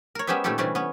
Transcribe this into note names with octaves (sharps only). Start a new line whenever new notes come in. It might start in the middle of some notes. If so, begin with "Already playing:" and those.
A#4 C#5
G#3 B3 C#4 G4 C5 E5
A#2 D#3 A3 C#4 G4 A4
C3 E3 G3 A3 C#4 D4
B3 C#4